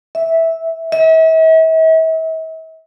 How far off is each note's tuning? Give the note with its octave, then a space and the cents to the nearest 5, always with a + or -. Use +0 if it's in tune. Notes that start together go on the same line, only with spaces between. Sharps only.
E5 -10
E5 -40